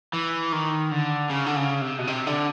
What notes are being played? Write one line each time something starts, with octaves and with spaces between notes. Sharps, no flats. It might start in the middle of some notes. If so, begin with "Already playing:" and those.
E3
D#3
D3
C#3
D3
C#3
C3
B2
C3
D3